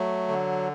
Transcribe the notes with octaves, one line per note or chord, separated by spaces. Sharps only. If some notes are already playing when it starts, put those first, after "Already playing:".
Already playing: F#3 A3
D3